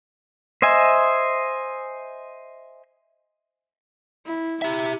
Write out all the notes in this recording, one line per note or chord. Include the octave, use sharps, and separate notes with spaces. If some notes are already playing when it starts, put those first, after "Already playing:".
C5 D#5 E5 G#5
E4
E4 G4 E5